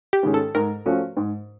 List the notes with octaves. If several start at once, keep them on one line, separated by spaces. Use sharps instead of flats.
G4
G#2 D#3 G#3 C#4
A4
G#2 A#4
F3 A3 C#4 F#4
G#2